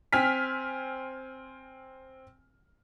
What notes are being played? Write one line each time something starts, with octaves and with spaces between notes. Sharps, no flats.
C4 G#5 F6 B6